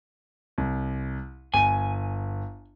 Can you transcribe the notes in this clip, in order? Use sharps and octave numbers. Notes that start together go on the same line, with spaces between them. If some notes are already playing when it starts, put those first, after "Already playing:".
C2
G1 G#5